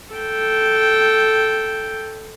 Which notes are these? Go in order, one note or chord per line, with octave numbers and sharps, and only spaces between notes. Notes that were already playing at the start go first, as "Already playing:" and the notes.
A4 G5